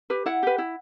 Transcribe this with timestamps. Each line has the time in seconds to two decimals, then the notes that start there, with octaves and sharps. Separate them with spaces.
0.10 G4 B4
0.26 E4 F#5
0.43 G4 B4
0.58 E4